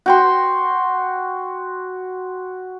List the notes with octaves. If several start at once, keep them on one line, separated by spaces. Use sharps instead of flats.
F#4 G5 C6